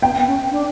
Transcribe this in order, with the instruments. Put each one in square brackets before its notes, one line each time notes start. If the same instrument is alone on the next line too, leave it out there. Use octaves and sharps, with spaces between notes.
[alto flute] B3 [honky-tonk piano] G5
[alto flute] C#4
D4